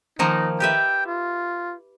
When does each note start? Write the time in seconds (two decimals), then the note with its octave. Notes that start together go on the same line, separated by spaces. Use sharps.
0.19 D#3 F3 A#3 D#4
0.60 G4 B4 E5 G5
1.06 F4